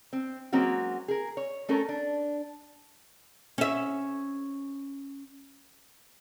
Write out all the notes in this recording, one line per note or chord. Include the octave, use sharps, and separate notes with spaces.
C4
F#3 G#3 A#3 C4 C#4 F#4
G#4 A#4
C#5
A3 C#4 A4 A#4
D4
C#4 E5